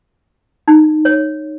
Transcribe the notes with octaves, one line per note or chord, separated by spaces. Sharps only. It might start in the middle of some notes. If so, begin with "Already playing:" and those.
D#4
C#5